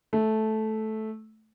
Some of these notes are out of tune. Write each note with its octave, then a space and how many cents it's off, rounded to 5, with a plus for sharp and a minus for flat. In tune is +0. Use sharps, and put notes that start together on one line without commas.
A3 -10